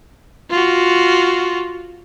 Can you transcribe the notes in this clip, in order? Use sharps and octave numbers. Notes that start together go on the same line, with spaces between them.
F4 F#4